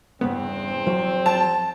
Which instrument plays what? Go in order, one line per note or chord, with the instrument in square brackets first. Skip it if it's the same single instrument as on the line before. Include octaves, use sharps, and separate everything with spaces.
[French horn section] E2 C4 [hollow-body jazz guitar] G2 C#3 B3
[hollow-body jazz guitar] F3 F#3
[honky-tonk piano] A5